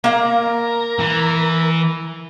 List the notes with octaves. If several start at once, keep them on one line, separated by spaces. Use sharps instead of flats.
A#3 A#4 F5
E3